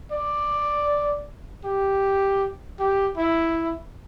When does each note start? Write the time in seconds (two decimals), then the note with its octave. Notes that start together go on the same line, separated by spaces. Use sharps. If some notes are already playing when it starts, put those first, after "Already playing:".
0.12 D5
1.65 G4
2.79 G4
3.17 E4